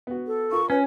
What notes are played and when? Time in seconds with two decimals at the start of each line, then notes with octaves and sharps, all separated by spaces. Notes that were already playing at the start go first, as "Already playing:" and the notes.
0.07 B3 F#4
0.27 A4
0.52 F4 A#4 C#6
0.70 C#4 B4 C#5